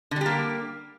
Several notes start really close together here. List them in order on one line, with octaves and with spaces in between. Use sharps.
D3 G3 G4 A#3